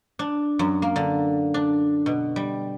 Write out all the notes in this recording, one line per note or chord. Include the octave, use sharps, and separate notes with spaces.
D4
F#2
A#3
D3
D4
B2
G3